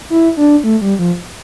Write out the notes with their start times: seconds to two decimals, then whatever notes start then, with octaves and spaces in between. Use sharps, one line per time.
0.10 E4
0.37 D4
0.64 A3
0.81 G3
0.99 F3